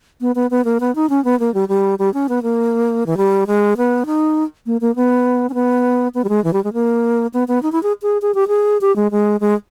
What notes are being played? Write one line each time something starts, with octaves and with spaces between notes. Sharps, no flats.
B3
B3
B3
A#3
B3
D#4
C#4
B3
A#3
G3
G3
G3
C#4
B3
A#3
E3
G3
G#3
B3
D#4
A#3
A#3
B3
C#4
B3
B3
G3
G#3
E3
G3
G#3
A#3
B3
B3
D#4
E4
G#4
G#4
G#4
G4
G#4
G4
G#3
G#3
G#3